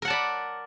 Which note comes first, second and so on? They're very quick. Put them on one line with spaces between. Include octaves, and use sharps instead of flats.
A#4 F#5 A5 D5 B5